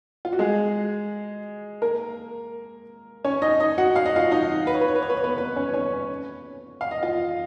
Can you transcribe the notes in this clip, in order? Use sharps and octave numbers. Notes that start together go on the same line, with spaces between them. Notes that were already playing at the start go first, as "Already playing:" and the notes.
F4
F#4
G#3 G#4
A#3 A#4
C#4 C#5
D#4 D#5
D#4 D#5
F#4 F#5
F5
D#5
F4 F5
D#4 D#5
B4
C#5
B4
C#5
B4
C#5
B4
C#5
B3 B4
B3 B4
C#4 C#5
C#4 C#5
F5
D#5
F4 F5